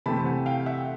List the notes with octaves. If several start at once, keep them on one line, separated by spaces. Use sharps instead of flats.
C3 E3 A3 C4 A5 B5
F#5 G#5
F5 G5
E5 F#5